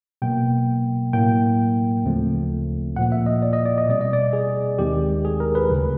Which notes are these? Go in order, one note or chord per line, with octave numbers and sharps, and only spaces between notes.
B2 F#3 A#3 G5
A2 F#3 A#3 G5
D2 C#3 F3 A3 C4
A#2 F3 A#3 F#5
E5
D#5
D5
D#5
D5
D#5
B2 G3 C4 D5
D#5
D5
G#4
D#2 D#3 G#3 C4 G4
G#4
A#4
B4
D2 C#3 F#3